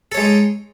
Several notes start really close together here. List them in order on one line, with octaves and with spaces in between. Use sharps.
A4 C#5 G#3 D#4